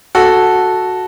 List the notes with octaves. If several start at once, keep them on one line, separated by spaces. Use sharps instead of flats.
F#4 A4